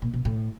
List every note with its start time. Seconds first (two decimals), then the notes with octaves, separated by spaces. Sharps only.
0.02 A#2
0.14 B2
0.25 A2